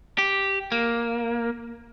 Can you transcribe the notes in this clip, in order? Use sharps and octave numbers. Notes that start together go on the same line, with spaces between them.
G4
A#3